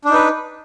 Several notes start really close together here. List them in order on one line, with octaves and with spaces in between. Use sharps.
D4 D#4 B4